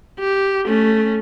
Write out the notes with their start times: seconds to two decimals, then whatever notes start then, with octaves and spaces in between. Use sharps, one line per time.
0.19 G4
0.67 A3 C#4